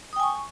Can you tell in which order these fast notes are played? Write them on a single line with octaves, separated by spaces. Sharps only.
D#6 G5 G#5 C#6